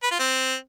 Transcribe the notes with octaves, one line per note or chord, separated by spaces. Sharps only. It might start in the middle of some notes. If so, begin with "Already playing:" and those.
B4
F4
C4